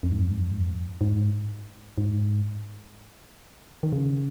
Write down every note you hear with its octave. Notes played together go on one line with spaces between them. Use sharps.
F2
G#2
F2
G#2
F2
G#2
F2
G#2
G#2
D#3
C#3